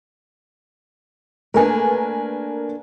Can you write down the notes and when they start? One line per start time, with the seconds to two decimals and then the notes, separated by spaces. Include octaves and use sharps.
1.54 A3 A#3 D4 A#4 B4 G#5